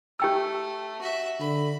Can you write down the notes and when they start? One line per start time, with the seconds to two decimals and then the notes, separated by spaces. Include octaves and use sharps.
0.20 A3 G4 G5 E6
1.01 F#4 E5
1.40 D3 B5